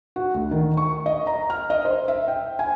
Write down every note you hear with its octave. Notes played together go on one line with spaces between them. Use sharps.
F#4
D2
D#3
C#6
D#5
A#5
F6
D#5
C5
E5
G5
G#5